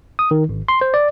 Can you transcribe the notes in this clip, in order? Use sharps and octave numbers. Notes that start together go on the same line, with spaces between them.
D#6
D#3
G#1
C6
C5
D5